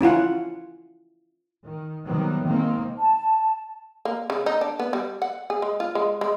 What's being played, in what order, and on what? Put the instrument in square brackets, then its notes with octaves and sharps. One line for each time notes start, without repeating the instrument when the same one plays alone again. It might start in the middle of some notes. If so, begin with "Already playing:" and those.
[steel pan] C#4 E4 F4 F#5
[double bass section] D#3
C3 D#3 F#3 G3 B3
D#3 G#3 A#3 C4
[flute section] A5
[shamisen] A#3
C#3
D#4
D4
B3
G3
F#5
G#4
G#3
F4
G#3
G#3